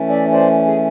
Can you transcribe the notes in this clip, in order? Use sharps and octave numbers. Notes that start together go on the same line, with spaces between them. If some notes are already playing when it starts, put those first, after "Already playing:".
Already playing: E3 A3 C#4
D5 E5
C5 D5
G#4